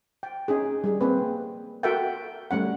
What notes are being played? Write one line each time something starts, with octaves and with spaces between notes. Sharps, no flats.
G5
C#4 D#4 G#4
G3 G#4
A#3 C4 B4
F#4 A4 A#4 E5 F#5 G5
G3 A3 C#4 F#5